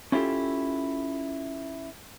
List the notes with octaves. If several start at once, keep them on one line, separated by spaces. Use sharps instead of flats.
C#4 E4 F4 G4 A4